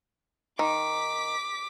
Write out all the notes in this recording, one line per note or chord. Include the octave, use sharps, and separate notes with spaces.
D#3 D6 B6